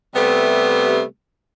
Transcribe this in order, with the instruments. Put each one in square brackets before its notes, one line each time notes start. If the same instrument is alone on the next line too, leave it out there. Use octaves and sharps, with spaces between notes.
[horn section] C3 G3 A3 B3